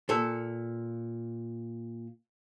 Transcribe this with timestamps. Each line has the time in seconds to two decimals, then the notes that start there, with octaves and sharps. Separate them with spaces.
0.09 A#2 A4